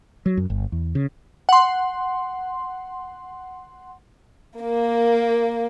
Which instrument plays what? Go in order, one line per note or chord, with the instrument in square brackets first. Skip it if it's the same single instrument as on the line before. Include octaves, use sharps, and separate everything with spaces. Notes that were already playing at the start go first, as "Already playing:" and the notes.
[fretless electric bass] F#3
F#2
G1
E2
C#3
[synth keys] F#5 C6
[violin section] A#3